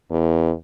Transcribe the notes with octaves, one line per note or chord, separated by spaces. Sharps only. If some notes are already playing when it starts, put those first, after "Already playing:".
E2